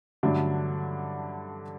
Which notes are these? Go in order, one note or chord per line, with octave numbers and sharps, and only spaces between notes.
G2 D3 F#3 A3 D4